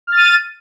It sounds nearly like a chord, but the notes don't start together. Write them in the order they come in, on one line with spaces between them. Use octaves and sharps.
F6 A6 D#7